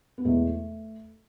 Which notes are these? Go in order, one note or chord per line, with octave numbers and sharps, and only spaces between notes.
B3
E2 B2 G#3 A3